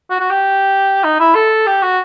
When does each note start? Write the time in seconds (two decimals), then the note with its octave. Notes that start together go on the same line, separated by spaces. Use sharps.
0.10 F#4
0.20 F#4
0.31 G4
1.04 D#4
1.20 E4
1.35 A4
1.67 G4
1.83 F#4